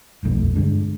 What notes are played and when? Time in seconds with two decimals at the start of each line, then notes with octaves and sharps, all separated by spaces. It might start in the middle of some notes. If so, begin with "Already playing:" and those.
0.23 D#1 B1 F2 A3
0.55 G2 D3 G#3 D4